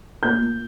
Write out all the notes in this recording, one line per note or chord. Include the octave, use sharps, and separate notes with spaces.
A#2 G6
A#2